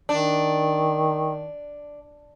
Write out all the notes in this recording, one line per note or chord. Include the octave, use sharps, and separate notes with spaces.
D#3 D4